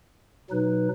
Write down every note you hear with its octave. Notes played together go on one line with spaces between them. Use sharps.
B2 F#3 D#4 B4